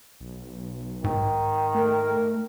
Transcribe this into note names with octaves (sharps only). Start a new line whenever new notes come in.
B1
G#2 D#3
A3 A#4